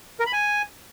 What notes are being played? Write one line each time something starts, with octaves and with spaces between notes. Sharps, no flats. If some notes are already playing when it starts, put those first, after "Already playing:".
A#4
B5
G#5